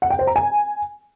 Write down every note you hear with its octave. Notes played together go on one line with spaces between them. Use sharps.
F#5
G5
C5
A#5
G#5